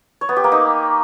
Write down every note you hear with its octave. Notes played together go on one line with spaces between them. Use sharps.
C#5
B3
G4
A#3
D#4